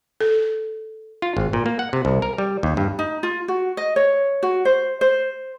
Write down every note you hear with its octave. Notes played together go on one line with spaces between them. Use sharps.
A4
F4
G#1
A#2
A#3
F#5
C3
C2
A#4
G3
D#2
G2
D#4
F4
F#4
D#5
C#5
F#4
C5
C5